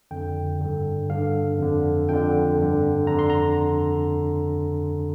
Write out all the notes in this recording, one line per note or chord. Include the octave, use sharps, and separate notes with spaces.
F2 D3 G5
G2 D3
G2 D3 F5
F2 D3
F2 D3 G5
G2 D3
F2 D3 A#5
C6
A#5